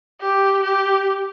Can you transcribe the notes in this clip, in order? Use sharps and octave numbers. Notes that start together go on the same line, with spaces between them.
G4
G4